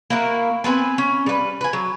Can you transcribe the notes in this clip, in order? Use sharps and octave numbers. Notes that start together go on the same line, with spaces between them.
A#3 E4 F#4
B3 C4 B4 G#5
C#4
G3 B4
B4 G#5
F#3